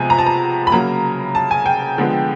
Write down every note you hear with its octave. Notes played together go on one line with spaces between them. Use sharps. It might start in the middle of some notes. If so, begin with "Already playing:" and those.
Already playing: C3 F3 G#3 B3 G#5
A#5
A5
A#5
B5
C#3 F#3 A#3 A#5
A5
G#5
G5
D3 F3 G#3 B3